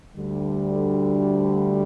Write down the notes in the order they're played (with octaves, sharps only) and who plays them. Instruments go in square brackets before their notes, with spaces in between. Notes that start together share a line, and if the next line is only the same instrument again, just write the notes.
[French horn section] D2 D3 G3